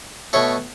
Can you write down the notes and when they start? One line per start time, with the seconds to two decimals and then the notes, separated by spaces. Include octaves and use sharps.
0.33 B2 A3 C#5